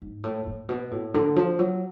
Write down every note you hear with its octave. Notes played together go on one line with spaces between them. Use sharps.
G#2
A2
A2
B2
A2
D3
F3
F#3